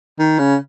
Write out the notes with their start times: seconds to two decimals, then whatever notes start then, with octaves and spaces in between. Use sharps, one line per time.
0.19 D#3
0.39 C#3